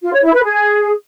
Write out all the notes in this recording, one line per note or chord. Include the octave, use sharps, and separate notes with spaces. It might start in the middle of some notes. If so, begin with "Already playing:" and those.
F4
C#5
E4
B4
G#4